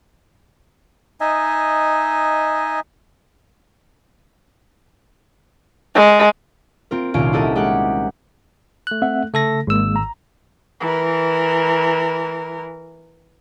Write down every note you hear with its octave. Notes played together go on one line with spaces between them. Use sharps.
D#4 D#5 E5 G#5
G#3
C4 F4 A#4
D#1 C2 C#4 F4 F5 D7
E4 F#4 G4 A4 A#4 D#5
G#3 G4 A#4 F#5
A3 F#6
C4 E5 F#5
C#3 A3 A4 A#6
G#1 G#3 A#3 E6
A#5
E3 A#4